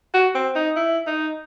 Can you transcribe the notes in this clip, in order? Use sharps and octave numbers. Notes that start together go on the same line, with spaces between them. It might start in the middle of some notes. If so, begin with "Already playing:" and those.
F#4
C4
D#4
E4
D#4